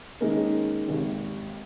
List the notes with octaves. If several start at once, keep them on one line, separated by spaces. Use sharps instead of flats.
D#3 G#3 A#3 C#4 A#4
G#1 D#2